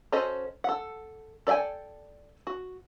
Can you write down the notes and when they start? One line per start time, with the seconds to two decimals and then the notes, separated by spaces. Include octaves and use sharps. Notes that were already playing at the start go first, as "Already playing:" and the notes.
0.12 C#4 F#4 A4 C5 D#5
0.64 A4 F#5
1.47 A4 D5 E5 G5 G#5
2.47 F#4